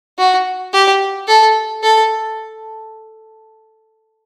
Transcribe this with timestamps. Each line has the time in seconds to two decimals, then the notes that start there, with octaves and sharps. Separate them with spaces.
0.18 F#4
0.73 G4
1.28 A4
1.83 A4